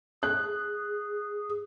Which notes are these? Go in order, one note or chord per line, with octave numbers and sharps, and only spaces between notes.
G#4 F#6